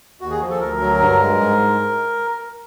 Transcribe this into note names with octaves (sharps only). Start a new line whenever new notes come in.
D#2 F#4
G#4
F3
A4
D2 A#4
F#3
G2
G#3
G#2